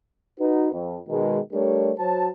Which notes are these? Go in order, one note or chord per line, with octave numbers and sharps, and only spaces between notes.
D#4 F#4 B4
F2
B2 D#3 G#3
G3 A3 D4 G4 A#4 C#5
F#3 C5 A5